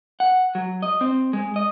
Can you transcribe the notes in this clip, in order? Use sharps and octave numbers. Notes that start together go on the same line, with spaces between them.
F#5
F#3
D#5
C4
G#3
D#5